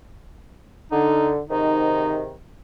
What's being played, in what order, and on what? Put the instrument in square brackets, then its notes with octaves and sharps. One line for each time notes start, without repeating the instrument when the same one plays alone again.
[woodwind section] D3 [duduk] D#4
[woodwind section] G#2 C3 D#3 [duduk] D#4